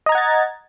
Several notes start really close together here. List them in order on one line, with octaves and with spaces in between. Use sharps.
D#5 A#5 G#6 F#5 A6